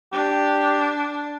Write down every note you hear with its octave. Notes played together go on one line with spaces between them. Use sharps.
D4 G4